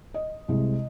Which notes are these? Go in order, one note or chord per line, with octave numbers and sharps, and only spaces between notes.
D#5
C2 C3 G#3